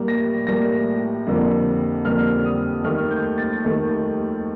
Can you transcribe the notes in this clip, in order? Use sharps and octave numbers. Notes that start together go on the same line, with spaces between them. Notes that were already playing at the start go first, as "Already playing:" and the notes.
Already playing: A2 G3 A#3
A#6
A2 G3 A#3 A#6
F2 D3 G3 A#3
F2 D3 G3 A#3 F6
D#6
D#2 D#3 A3 F6
G6
A6
D#2 D#3 A3